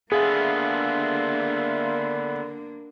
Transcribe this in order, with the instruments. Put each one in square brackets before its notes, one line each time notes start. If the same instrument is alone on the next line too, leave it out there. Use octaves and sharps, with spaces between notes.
[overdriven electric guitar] D3 B3 [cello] A#3 D4 [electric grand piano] G#4 [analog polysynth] E5 F5 C6